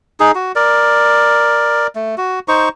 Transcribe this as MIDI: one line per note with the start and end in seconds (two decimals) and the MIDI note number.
0.20 0.32 63
0.20 0.32 68
0.35 0.52 66
0.56 1.87 70
0.56 1.87 74
1.95 2.15 57
2.18 2.40 66
2.48 2.69 63
2.48 2.69 72
2.48 2.69 85